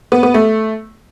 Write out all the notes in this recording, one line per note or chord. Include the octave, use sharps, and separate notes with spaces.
B3
B3
A3